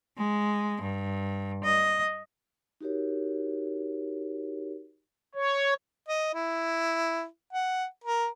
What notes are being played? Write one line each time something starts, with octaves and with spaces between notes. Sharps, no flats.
G#3
G2
D#5
D#4 F#4 G4 A#4 C#5
C#5
D#5
E4
F#5
A#4